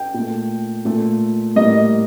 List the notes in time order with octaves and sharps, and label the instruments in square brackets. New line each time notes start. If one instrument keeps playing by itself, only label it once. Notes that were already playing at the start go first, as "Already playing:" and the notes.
Already playing: [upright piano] G5
A#2
A3
A#2 A3
A2 G3 A#3 D#5